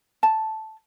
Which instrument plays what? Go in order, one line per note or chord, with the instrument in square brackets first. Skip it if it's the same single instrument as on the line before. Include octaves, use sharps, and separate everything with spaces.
[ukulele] A5